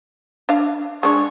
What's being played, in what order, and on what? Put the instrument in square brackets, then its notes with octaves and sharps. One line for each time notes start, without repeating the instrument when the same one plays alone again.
[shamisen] D4 F5
[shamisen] G#3 D4 [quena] C#6